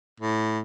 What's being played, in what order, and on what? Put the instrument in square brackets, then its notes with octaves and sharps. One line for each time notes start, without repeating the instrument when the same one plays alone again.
[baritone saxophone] A2